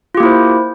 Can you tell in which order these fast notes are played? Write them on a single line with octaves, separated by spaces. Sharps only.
F4 G4 A#3 E4 C5